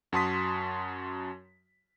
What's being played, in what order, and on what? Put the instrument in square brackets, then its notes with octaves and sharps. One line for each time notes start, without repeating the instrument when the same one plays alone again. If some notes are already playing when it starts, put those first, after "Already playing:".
[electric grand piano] F#2 F#4 A5 C6 D#6 B6